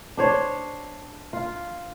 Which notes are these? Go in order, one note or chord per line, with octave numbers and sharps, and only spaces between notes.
D4 C5 C#5
F4